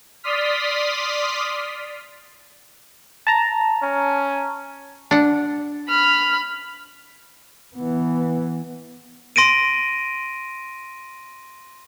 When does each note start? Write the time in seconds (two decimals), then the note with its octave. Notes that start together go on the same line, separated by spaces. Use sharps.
0.23 D5 C6 D#6 F6 B6
3.27 A5 A#5
3.82 C#4
5.11 D4 F#5
5.88 B5 F6
7.76 E3 B3
9.36 C6 A#6 D7 D#7